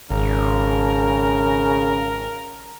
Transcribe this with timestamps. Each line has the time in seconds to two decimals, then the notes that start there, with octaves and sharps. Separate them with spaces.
0.11 G#1 C#3 A#4